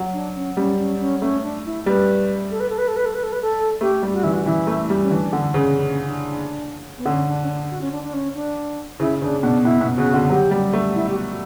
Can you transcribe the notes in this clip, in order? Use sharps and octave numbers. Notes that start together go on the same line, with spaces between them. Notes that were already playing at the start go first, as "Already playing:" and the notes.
Already playing: F#3
D4
C#4
G3 C#4
C#4
C#4
A3 C#4
D4
E4
G3 B4
A4
B4
A4
B4
A4
B4
A4
B4
A4
B4
A4
A3 G4
G3
F#4
E3 E4
F#4
E3 E4
A3
G3
C#4
E3 D4
D3
C#3
C#4
D4
B3
D3 C#4
D4
C#4
D4
F#4
C#4
D4
D4
C#4
D4
C#3 E4
C#3 D4
B2 D4
B2 E4
B2
C#3 F#4
D3
F#3 G4
G3
A3
E4
G4
F#4